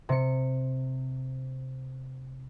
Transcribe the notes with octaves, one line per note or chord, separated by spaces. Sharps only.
C3 C#7